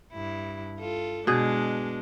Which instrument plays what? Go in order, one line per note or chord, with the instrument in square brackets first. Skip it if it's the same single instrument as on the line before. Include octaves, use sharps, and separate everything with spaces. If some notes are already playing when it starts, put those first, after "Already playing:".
[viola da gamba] G2 E4
F4 A4
[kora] B2 G#4 [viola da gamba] G#3 D4